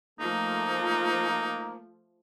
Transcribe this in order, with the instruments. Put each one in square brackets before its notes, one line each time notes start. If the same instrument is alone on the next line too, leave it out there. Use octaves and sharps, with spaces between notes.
[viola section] F3 A3 [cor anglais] A#3 [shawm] D#4